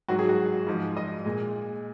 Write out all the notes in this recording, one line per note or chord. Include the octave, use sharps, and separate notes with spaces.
G#2 F#3 F#4
G#4
F#4
G#2 F3 G#3
D#5
A#2 G#3